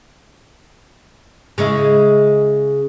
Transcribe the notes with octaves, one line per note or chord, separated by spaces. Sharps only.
C#3 G#3 E4